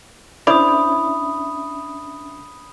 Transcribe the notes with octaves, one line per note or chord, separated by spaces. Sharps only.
C#4 D4 E4 C5 D5 E5 B5 D#6